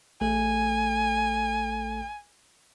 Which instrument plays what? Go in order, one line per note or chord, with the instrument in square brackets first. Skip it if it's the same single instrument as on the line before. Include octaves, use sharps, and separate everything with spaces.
[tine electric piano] A1 A3 A4 [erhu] G#5